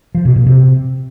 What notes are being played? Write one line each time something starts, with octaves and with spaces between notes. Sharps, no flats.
F3
B2
A#2
C3